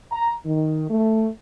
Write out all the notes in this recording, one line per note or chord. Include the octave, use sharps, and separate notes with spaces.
A#5
D#3
A3